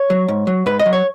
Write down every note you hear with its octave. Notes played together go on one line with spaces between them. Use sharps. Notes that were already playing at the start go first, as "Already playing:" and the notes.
Already playing: C#5
F#3
G#2
F#3
G#2 B4
D#5
F#3
C#5